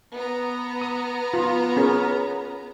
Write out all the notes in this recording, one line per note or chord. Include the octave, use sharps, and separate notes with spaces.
B3 A#5
D#6
F4
C#4 G#4 A#4